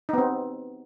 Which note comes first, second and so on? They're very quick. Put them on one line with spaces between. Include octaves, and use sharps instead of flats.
D#4 B3 C4